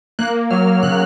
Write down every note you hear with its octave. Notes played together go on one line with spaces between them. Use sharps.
A#3 F#6
A#3
F#3 F6
A#3
C#3 F#6